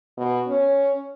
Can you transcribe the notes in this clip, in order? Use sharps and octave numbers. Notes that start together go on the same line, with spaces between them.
B2
C#4